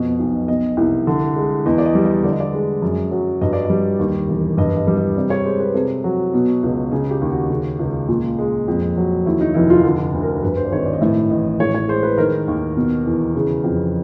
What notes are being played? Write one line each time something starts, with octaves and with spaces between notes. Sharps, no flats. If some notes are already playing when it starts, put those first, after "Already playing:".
Already playing: F2 B2 D#5
B1
B2 D#5
C2
D3
G#3
E2 D#5
D5
D#5
G3
D#5
D3 D5
D#5
D5
G#3
F#2
F#3
G2 D#5
D5
G3 D#5
D#2
E1
G2 D#5
D#5
G3
D#5
C3 D5
C#5
G#3 C5
B4
C3 A4
F#3
B2
C#2
C#3 G#4
G4
D#2
F#4
C#3
C#2
A#2 F4
G#3
F2
F#3
D#2 E4
D#4
F1 E4
F4
D3
D2
A#4
G2 B4
C5
D5
G#1 C#5
D5
D#5
A2 E5
A1 D#5
A2 C#5
C#5
G#3 C5
B4
D#3 A#4
D#2
B2
E2
C#3
F2